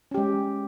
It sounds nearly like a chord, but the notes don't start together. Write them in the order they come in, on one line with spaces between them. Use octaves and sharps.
C#4 G4 G#3